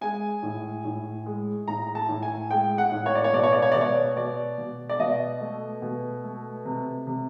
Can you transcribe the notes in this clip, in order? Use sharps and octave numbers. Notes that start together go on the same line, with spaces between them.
G#3 G#5
A2
A2
G#3
A2 A#5
A5
A2
G#5
G#3 G5
F#5
A2
C#5
D5
C#5
B2 D5
C#5
D5
C#5
B2 D5
C#5
B2 D5
B2
D5
B2 D#5
A3
B2
A3
C3
C3